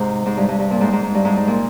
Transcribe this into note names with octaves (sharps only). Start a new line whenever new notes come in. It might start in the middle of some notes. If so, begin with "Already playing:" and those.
Already playing: G#2 C3
G#2
G2
G2
G2
A#2
G#2
G#2
G#2
G2
G#2
G#2
A#2